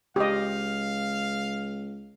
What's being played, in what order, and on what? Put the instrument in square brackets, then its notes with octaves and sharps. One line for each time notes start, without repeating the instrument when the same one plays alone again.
[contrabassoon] C#2 [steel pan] G4 D#5 [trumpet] F5